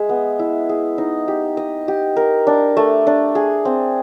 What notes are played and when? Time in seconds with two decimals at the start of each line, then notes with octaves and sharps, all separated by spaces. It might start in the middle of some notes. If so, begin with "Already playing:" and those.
Already playing: G#3 G#4 E5
0.09 B3
0.39 E4
0.69 G#4
0.98 D#4
1.28 G4
1.57 D#5
1.88 G4
2.17 A#4
2.47 D4
2.77 A3
3.07 D4
3.35 G#4
3.65 C4